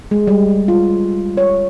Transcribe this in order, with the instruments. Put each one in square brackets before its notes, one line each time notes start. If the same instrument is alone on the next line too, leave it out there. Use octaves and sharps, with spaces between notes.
[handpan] G#3
G3
F4
C#5